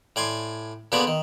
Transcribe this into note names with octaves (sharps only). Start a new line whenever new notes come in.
A2 D5 G#5 C6
A#2 D3 B3 G#4 D5 G#5
D#3